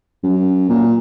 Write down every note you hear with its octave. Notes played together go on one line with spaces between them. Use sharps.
F#2
A#2